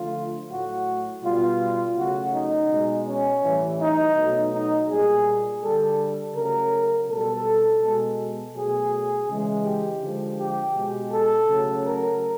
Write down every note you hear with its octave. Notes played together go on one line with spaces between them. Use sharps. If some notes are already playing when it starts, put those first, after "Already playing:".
Already playing: D3 F3 A3 F4
A2 F#3 A3 F#4
B2 G3 F4
C#3 F#3 A3 F#4
D#4
B2 G#3
C#4
A2 E3 G3
D#4
B2 F#3 A3
D#4
A#2 G3 G#4
D3 G3 A4
C#3 F#3 A3 A#4
B2 G3 A4
B2 G#3
B2 F#3 A3 G#4
C#3 E3 G#3
G4
D3 F3 G#3
G4
B2 G#3
A4
C#3 F#3 A3
A#4